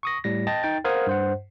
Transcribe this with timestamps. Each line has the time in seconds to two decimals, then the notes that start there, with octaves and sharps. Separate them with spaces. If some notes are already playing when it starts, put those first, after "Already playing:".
0.03 C#6 D#6 A#6
0.24 A2 G3 A#6
0.47 D#5 G5 A5 A6 A#6
0.63 D#4 G5 A6
0.85 A#4 C5 F5 F#5 D#6 G#6
1.07 G2 C5 F#5